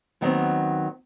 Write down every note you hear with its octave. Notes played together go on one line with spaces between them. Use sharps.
D#2 D#3 F#3 A3 B3 C4